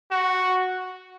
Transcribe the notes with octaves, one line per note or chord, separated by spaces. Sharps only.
F#4